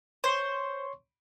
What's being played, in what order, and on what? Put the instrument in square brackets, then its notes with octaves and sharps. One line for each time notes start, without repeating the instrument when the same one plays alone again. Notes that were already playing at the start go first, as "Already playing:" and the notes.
[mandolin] C5 [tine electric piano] C#5 C6 C#6